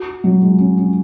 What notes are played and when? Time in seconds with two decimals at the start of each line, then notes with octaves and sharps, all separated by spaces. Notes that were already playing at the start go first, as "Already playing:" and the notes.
Already playing: F#4
0.24 F#3
0.42 G#3
0.60 C#4
0.77 C#4